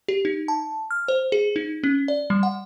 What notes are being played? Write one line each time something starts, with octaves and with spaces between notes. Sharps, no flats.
G4
D#4
A5
F6
C5
G#4
D#4
C#4
D5
G3
F#5